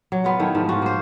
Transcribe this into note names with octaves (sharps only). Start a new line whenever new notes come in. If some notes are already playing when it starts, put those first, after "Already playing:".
F#3
B3 F4 A#4
D#3 A3 E4
G#2 F3
F4 F#4
A#3 C5